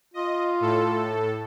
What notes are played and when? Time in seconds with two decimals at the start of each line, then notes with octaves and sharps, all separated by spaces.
0.14 F4 D#5
0.60 A2 A4